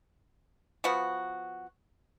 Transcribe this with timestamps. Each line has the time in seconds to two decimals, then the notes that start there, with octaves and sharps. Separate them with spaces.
0.84 F3 B3 F#4